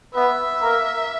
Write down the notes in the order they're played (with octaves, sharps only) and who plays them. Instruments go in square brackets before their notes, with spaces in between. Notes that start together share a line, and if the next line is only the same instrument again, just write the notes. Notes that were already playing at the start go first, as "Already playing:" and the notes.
[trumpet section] B3 B4 [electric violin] E5
[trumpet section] A#3 A#4